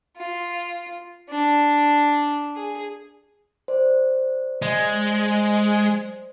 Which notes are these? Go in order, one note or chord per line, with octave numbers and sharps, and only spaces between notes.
F4
D4
G#4
C5 D5
G#3